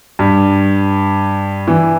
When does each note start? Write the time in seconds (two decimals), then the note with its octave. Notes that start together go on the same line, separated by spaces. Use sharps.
0.19 G2
1.68 E3